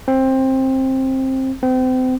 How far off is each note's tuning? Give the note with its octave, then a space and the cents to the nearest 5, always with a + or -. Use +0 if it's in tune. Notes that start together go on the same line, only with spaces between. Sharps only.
C4 +15
C4 -35